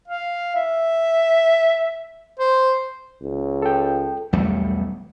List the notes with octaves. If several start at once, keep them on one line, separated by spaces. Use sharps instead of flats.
F5
E5
C5
C#2
A4 G5
B1 E2 G3 A3